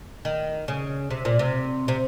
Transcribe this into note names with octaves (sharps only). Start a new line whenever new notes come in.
D#3
C#3
C3
A#2
C3
C3